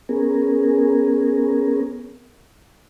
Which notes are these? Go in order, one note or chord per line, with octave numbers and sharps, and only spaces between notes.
B3 C#4 G#4 A#4